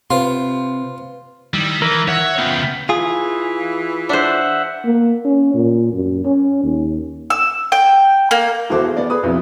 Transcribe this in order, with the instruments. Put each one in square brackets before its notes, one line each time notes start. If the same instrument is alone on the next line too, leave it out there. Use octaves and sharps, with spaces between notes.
[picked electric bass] C3 [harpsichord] F4 [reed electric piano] B4 C5 C6
[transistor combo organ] D#3 E4 [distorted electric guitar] G3
[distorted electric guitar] E3 [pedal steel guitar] A#4
[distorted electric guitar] C#5 [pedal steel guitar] E5 F#5
[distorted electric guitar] C#3 B3 [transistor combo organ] F4 G5
[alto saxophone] E3 [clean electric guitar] F4 G#4
[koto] D4 C5 [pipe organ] E5 F#5
[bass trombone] A#3
C#4
A#2
F#2
C#4
D#2
[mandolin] E6
G5
A#3
[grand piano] E1 E3 F#4 A4 C5 D6
G#4
B3 D5
G#4 B4 D#6
B1 F2 E4